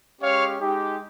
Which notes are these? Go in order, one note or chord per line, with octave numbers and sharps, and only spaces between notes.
G#3 C#4 G4 C#5 F5
G#3 D#4 G4